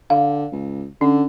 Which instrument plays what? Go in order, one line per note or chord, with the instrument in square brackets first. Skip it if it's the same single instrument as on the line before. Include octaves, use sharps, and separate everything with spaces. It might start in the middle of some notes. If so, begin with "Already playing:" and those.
[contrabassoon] D3 [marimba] F5
[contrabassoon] C#2
[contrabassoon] D3 [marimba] C#4